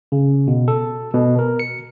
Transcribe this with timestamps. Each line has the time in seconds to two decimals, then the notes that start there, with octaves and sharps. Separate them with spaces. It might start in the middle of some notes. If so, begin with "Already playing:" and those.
0.12 C#3
0.47 B2
0.68 A4
1.14 B2
1.39 A#4
1.59 C#7